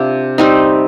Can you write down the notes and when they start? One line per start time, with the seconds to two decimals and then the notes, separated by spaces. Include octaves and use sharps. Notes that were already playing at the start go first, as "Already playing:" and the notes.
Already playing: C3 D4 F4
0.38 G3 C4 D#4